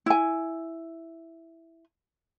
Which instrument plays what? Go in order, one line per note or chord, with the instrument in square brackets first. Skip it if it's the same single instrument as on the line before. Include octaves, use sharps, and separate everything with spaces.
[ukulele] E4 G#5